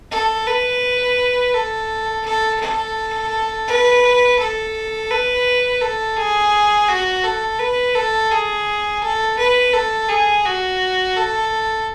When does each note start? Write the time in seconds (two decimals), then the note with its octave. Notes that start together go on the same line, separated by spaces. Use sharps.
0.11 A4
0.46 B4
1.54 A4
2.25 A4
2.60 A4
3.67 B4
4.39 A4
5.10 B4
5.81 A4
6.17 G#4
6.88 F#4
7.24 A4
7.59 B4
7.95 A4
8.31 G#4
9.02 A4
9.39 B4
9.73 A4
10.09 G#4
10.45 F#4
11.16 A4